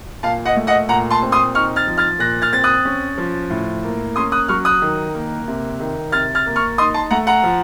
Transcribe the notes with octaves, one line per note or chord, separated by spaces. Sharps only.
A#2 F5 A5
D#5 F#5
A3
D#5 F#5
A#2 F#5 A#5
A5 C6
C4
C6 D#6
D#4 C#6 F6
F6 A6
F3
F6 A6
A#2 F#6 A#6
F6 A6
C4 A6
D#6 F#6
C#4
F3
A2
A#3
C#4 C6 D#6
D#6 F#6
F#3 C#6 F6
D#6 F#6
D#3
A#3
C3
D#3
C3 F6 A6
F6 A6
A#3
C#6 F6
D#4 C6 D#6
A5 C6
A3 F#5 A#5
F#5 A#5
F3